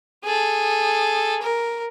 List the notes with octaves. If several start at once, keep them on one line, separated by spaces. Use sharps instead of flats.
G#4 A4
A#4